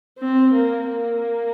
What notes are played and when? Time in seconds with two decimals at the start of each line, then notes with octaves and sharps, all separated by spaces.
0.19 C4
0.53 A#3
0.89 A#3